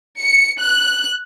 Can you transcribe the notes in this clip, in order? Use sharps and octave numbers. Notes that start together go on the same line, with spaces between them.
C#7
F#6